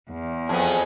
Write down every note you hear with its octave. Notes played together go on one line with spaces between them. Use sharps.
E2
F2 B3 G#4